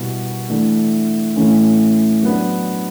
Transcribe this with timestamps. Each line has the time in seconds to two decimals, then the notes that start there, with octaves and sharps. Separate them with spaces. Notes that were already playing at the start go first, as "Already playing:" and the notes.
Already playing: B2 G3 B3 E4
0.49 E3 A3 D4
1.36 A2 E3 A3 C#4
2.23 F#3 B3 D4